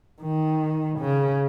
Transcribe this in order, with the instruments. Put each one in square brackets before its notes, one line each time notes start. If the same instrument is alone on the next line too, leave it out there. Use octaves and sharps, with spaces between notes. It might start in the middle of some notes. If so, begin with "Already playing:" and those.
[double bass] D#3
C#3